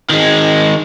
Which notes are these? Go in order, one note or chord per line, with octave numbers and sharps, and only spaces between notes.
D#3 G#3